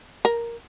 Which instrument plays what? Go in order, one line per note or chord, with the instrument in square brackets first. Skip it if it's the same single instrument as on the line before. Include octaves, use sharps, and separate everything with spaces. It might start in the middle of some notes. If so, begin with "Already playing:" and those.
[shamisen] A#4